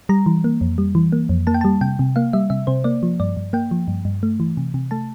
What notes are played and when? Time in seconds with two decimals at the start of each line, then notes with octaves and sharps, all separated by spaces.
0.09 G3 A#5
0.26 E3
0.44 A#3
0.61 F2
0.78 G3
0.95 E3
1.12 A#3
1.29 F2
1.47 A#3 A5
1.54 G5
1.61 G3 A5
1.81 C3 G5
1.99 C3
2.16 A#3 F5
2.33 G3 E5
2.50 C3 E5
2.67 C3 C5
2.84 A#3 D5
3.03 F3
3.20 G2 D5
3.37 G2
3.53 A#3 G5
3.71 F3
3.88 G2
4.05 G2
4.23 A3
4.40 E3
4.57 C3
4.74 C3
4.91 A3 A5